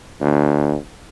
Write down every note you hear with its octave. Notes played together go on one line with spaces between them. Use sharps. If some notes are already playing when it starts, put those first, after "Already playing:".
D2